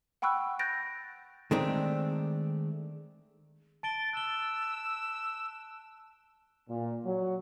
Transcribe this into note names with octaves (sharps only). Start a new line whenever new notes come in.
F#5 G5 B5 C#6 E6 F#6
F#6 G6 A6 A#6 D7
D#3 G#3 A3 C4 D4
A5 A6 D7 G7
E6 F#6 G7
A#2
F#3